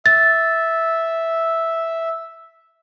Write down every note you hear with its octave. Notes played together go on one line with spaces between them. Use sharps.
E5 A6